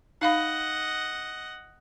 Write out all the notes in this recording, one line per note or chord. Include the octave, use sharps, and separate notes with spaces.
D#4 D#5 F5 F#5 B5